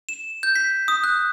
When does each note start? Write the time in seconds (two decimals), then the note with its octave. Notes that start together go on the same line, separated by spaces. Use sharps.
0.09 E7
0.43 G6
0.55 B6
0.88 D#6
1.04 F#6